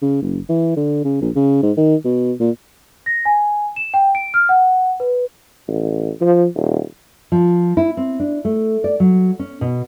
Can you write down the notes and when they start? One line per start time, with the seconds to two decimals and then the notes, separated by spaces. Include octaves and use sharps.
0.02 C#3
0.22 F#1
0.49 E3
0.76 D3
1.04 C#3
1.21 A#1
1.35 C#3
1.63 G#2
1.77 D#3
2.05 B2
2.40 A#2
3.06 A#6
3.25 G#5
3.76 E7
3.94 G5
4.15 D7
4.34 F6
4.49 F#5
5.00 B4
5.68 A1
6.21 F3
6.55 D#1
7.32 F3
7.77 E4
7.97 C4
8.20 D4
8.45 A3
8.84 D5
9.00 F#3
9.39 C#4
9.61 B2